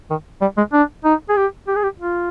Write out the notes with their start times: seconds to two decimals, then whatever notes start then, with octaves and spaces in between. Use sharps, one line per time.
0.10 D#3
0.41 G3
0.57 G#3
0.73 D4
1.04 D#4
1.29 G#4
1.37 G4
1.67 G4
1.76 G#4
1.83 G4
2.00 F4